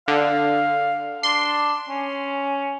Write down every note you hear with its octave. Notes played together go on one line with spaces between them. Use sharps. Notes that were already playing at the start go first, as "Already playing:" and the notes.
D3 F5
D4 C6
C#4